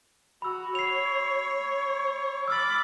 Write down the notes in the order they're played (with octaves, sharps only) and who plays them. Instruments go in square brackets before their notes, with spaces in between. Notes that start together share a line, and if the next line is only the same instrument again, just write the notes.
[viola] F#4 [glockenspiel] B5 E6
[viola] C#5 [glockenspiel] C7 F7
[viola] B5 D6 [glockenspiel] E6 F6 A6